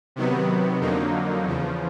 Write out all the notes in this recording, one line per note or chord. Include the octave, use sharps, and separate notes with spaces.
C3 D#3 F#3 B3
F2 D3 F#3 A#3 D#4
E2 C#3 F3